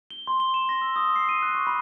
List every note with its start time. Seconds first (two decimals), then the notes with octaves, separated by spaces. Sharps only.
0.11 G7
0.27 C6
0.40 G7
0.54 E7
0.69 A#6
0.82 E6
0.96 D#6
1.16 C7
1.29 D#7
1.42 F#6
1.55 C#6
1.67 B5